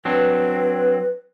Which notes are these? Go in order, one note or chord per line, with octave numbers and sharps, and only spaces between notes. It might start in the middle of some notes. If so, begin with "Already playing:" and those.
F#3 C4 D4 B4